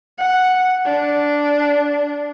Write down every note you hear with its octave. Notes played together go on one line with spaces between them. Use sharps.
F#5
D4